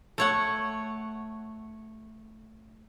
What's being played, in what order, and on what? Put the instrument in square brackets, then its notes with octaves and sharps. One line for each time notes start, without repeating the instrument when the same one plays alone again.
[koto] A3 C#5 F#5